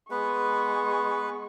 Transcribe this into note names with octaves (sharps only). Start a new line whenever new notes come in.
G#3 B3 B4 C#6